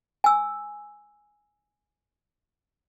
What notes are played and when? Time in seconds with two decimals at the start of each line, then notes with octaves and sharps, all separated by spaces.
0.24 G#5 E6